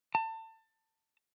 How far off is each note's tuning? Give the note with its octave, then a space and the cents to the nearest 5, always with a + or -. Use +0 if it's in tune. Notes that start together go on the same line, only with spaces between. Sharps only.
A5 +25